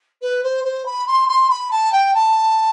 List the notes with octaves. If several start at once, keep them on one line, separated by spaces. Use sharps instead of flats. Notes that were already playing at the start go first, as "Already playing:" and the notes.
B4
C5
C5
B5
C6
C6
B5
A5
G5
A5